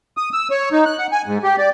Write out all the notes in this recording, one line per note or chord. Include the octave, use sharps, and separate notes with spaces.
D#6
E6
C#5
D#4
F#6
F#5
G#5
G#2
G4
D5